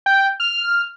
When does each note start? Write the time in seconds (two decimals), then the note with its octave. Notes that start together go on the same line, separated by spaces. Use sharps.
0.06 G5
0.40 F6